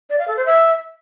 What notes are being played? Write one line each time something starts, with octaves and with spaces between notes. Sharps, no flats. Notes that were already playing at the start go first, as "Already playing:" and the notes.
D5
F5
A4
C5
E5